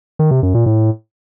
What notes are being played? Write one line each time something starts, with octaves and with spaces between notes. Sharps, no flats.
D#3
C3
F#2
A#2
A2